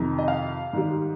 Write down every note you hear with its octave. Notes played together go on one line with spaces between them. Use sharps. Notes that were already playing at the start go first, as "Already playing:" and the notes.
Already playing: F2 C3 D#3
D#5
F5
G#2 D#3 G3